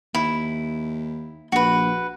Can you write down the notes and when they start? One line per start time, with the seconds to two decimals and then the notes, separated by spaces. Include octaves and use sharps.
0.14 D#2 E4
1.52 A#1 F#4 B4